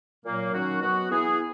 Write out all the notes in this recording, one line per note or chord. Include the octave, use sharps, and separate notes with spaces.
A#2 F#3 A#3
D#3 F#3 C#4 F#4
B2 F#3 B3 F#4
E3 B3 E4 G#4